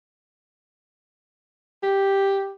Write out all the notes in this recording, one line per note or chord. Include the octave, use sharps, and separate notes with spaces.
G4